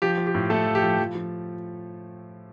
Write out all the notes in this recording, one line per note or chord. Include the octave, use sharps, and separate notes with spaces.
F3 G4
F3
G4
A2
A2 A3 A4
F3
G4
F3
F3
F3